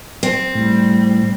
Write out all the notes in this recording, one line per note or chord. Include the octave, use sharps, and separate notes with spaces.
C4
A2 G3